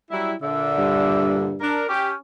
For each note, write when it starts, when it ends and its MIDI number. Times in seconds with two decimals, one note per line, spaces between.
0.11 0.33 54
0.11 0.33 55
0.11 0.33 64
0.43 1.52 46
0.43 1.52 50
0.43 1.54 76
0.78 1.66 43
1.61 1.84 62
1.61 1.84 70
1.89 2.15 61
1.89 2.10 67